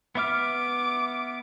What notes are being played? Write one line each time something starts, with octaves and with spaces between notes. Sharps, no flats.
B3 E5 D6 F6